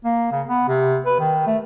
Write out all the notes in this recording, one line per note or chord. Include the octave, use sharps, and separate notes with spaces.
A#3
C#3
B3
C3
B4
D#3
A3